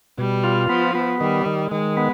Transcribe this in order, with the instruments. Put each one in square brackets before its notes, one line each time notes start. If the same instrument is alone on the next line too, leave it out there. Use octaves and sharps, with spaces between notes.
[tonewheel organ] B2 [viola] G3
[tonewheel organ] F4
[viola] F3 [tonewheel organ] B3
[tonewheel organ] B3
[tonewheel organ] D#3 [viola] G3
[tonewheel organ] D#3
[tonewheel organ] D#3 [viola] G#3
[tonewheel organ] B3